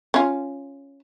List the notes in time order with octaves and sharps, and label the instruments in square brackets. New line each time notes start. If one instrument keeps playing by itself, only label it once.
[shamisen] C#4 F4